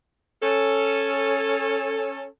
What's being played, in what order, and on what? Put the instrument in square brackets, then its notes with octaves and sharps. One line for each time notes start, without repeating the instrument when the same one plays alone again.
[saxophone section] C#4 A4